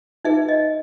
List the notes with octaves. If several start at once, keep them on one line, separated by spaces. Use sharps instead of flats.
D#4 G#4 B4 E5
D#5